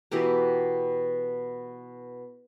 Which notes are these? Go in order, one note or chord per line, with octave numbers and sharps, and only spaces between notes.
B2 E3 G4 A#5